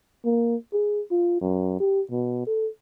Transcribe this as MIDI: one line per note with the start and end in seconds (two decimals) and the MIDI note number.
0.25 0.56 58
0.73 1.01 68
1.11 1.38 65
1.42 1.78 42
1.80 2.01 67
2.11 2.44 47
2.47 2.68 69